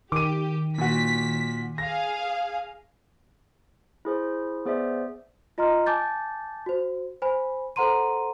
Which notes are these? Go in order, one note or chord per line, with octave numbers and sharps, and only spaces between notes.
D#3 G4 D6 D#7
A#2 F#4 B6
G#4 F5 A#6
E4 G#4 C5
B3 G#4 C5 D5 E5
F4 D#5 A#5 C6 F6
G#5 A5 D6 G6 A6
F#4 C5
C5 G#5 B5
A4 C5 F#5 A#5 C6 D#7